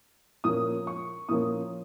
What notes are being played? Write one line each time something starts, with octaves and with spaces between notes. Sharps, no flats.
A#2 F3 A#3 C#4 D#6
C#6
A#2 F3 A#3 C#4 D#6